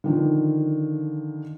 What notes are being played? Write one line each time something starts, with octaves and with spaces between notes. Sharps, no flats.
D3 D#3 F3